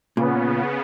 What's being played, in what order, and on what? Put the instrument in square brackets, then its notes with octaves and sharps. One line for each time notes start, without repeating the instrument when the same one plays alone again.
[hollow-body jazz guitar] A#2 [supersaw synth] C#3 B3